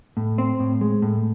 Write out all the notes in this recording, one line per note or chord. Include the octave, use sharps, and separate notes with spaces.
A2
C4
A2
G#3
A2